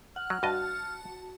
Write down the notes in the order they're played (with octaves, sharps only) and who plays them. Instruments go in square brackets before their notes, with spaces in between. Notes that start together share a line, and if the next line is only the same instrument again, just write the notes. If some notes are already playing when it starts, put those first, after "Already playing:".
[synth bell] F#5 [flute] F6
[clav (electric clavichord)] F#3
[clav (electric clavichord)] G2 D#5 [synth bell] F#4 A5